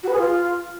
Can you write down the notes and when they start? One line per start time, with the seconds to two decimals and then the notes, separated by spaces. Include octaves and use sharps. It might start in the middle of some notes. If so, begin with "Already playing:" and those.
0.03 F#4
0.08 B4
0.14 G#4
0.19 F4